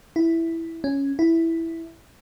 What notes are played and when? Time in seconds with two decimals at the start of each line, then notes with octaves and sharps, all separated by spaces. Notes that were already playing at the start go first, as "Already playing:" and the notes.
0.16 E4
0.84 C#4
1.19 E4